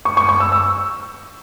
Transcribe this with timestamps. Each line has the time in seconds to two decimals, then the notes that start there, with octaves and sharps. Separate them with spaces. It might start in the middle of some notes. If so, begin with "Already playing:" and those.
0.05 C#6
0.17 C#6
0.29 C#6
0.40 E6
0.52 E6